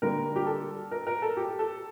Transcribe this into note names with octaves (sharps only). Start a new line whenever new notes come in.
D3 G3 A#3 A#4
G4
A4
A#4
A#4
A4
G4
A4